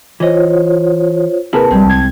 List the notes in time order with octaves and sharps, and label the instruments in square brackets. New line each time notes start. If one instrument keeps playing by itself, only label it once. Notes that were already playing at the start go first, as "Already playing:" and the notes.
[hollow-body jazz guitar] E3 D#5 [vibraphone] F4 C5 C#5
[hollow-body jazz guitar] C3 A#3 E4 [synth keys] G#4 A#4 B4 [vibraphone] A5
[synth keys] A#1 G3 [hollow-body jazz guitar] G#3 C4
[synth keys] C2 G#6